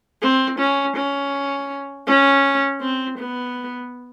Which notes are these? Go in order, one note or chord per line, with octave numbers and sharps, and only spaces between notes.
C4
C#4
C#4
C#4
C4
B3